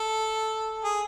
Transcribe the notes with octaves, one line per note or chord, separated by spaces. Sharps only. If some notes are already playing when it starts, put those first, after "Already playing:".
Already playing: A4
G#4